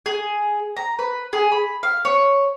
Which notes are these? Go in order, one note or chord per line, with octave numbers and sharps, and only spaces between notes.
G#4
A#5
B4
G#4
B5
F5
C#5